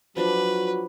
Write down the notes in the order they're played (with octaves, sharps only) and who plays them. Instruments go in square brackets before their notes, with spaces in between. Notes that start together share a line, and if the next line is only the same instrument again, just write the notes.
[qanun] F3 D4 D6 [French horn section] F#3 F#4 [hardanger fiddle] B4